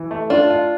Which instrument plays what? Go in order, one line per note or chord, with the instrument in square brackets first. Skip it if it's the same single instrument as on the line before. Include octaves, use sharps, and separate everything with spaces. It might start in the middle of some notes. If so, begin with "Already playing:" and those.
Already playing: [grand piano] E3
A3
[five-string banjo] D4 [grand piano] F4
[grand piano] F4